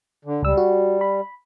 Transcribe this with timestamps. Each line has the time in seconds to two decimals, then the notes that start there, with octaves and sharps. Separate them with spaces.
0.25 D3
0.42 C#2 G3 E6
0.57 F#4
1.01 B5